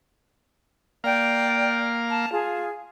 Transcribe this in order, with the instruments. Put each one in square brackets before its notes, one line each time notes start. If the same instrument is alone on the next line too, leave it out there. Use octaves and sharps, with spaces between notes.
[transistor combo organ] A#3 F5 [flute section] D5 G5
[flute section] A5
F4 G#4